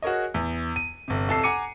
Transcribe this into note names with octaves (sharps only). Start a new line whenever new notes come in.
F#4 G#4 A#4 C#5 D#5
E2
D#7
G1 C3
C2 F2 A4 A5 E6 C7
F#5 G#5 A#5 D6 C#7 D#7